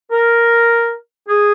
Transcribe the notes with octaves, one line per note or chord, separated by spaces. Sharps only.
A#4
G#4